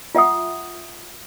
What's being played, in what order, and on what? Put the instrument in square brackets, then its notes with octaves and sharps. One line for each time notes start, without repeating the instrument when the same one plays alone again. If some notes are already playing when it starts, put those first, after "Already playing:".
[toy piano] F4 E5 F#5 D#6